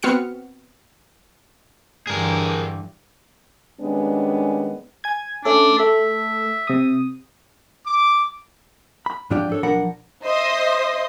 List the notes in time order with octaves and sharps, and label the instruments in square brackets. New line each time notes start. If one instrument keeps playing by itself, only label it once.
[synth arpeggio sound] B3 C4 F#4 F6 C#7
[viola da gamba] G2 D3 E3 [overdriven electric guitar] G#4 A#4
[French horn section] D#3 G3 G#3 B3 C#4 D4
[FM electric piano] G#5 G#6
[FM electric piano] A3 C#4 A4 [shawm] D4
[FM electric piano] A3 A4 [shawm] E5
[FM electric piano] C3 D#6
[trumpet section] D6
[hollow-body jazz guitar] B5
G#2 F3 D4 F4 G4 D5
D4 A4 C#5
B1 F3 D4 A#4 F#5 B5
[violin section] C5 D#5 E5 C6 D#6